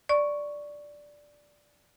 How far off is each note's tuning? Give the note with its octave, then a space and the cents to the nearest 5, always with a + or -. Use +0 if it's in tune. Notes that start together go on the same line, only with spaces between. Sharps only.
D5 +0 C#6 +0